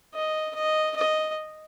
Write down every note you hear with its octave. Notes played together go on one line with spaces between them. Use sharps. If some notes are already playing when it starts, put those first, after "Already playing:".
D#5
D#5
D#5